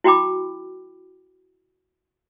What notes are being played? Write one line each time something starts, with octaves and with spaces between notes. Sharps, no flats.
E4 F#4 G5 B5 D6